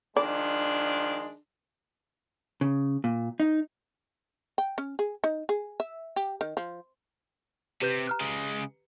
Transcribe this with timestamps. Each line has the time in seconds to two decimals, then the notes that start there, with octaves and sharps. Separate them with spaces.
0.16 D#3 F3 G#3 D4 D5
2.61 C#3
3.04 A#2
3.40 D#4
4.58 G5
4.78 C#4
4.99 G#4
5.24 D#4
5.49 G#4
5.80 E5
6.16 G4
6.41 D#3
6.57 F3
7.82 C3 G4 B4 G6
8.07 A#5 F6 F#6
8.20 C#3 G#3